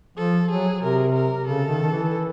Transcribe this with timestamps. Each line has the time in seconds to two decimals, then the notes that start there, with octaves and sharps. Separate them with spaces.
0.17 F3 A4
0.50 F#3 G#4
0.83 C3 A#4
1.15 A#4
1.47 C#3 A4
1.68 D#3
1.83 D#3
1.90 E3